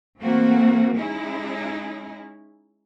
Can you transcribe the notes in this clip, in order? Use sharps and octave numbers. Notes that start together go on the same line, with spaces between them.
E3 A3 A#3 C4 F#4
G#3 C#4 D#4 E4 G#4